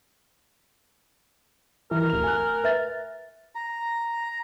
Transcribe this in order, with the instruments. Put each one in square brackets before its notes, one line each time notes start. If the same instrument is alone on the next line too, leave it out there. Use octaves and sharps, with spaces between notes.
[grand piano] E3 [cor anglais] A#4
[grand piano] D1 F7
G#5 F#6
[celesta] B4 E5 A6
[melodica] A#5